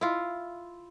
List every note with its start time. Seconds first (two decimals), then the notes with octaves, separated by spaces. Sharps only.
0.01 E4 F4